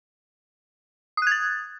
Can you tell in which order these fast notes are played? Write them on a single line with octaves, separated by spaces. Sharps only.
D#6 F#6 G#6 A6